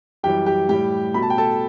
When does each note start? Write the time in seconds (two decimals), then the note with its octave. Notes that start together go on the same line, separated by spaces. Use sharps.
0.23 F#2 E3 G3 G4 G5
0.46 G4 G5
0.69 A2 G3 G4 G5
1.14 B2 A3 B5
1.22 A5
1.30 G5
1.38 A4 A5